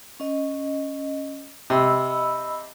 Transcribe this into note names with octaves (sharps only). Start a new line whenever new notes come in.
C#4 D#5
C3 D#5 B5 E6